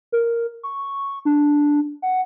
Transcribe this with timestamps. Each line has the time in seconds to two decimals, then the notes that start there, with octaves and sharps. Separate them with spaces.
0.12 A#4
0.63 C#6
1.25 D4
2.02 F#5